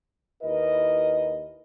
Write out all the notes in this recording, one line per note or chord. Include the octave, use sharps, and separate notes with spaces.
D#2 E4 A#4 B4 D#5